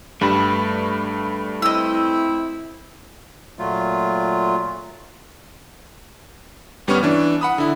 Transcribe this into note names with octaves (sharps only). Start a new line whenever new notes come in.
G2 G3 A3 B4
C4 E4 D#5 E6
A#2 F#3 A3 F4
G1 G3 B3 C#4 C#6 F6
E3 D4
F#5 B5 D#6
D3 E4